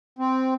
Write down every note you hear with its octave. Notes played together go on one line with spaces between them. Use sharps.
C4